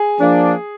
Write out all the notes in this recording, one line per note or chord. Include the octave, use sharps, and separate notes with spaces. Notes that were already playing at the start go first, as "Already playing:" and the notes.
Already playing: G#4
F3 A#3 D4